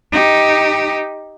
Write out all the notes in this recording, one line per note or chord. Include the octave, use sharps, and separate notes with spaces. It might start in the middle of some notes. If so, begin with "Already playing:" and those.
D#4 G4